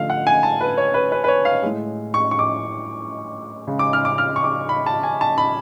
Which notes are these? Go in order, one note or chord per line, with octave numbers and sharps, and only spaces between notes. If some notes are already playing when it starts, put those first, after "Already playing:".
Already playing: D3 F3 A3 F5
F#5
G#5
A5
B4
C#5
B4
B4
B4
C#5
F5
A2 G#3
C#6
C#6
D6
C#3 G#3
D6
F6
D6
F6
C#6
D6
B5
A5
G#5
A5
B5